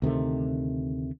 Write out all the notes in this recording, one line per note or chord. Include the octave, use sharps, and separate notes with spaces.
D2 C3 D#3 A3